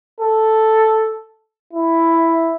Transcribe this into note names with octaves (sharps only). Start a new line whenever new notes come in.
A4
E4